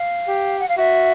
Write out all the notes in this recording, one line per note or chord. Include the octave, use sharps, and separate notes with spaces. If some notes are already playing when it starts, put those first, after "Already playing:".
Already playing: F5
G4
F#5
F5
F#4 E5